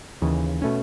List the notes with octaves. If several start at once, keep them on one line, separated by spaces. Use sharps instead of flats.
D#2 C#3 E3
B2 A3 C#4